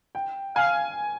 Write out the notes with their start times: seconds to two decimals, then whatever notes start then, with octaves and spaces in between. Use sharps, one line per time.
0.15 G5
0.56 F5 G#5